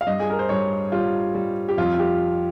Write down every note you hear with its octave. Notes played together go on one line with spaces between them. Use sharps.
F5
G2 D#5
G#4
A#4
C5
G2 C#5
G3 F4
G3
G4
F2 F4
F4
G4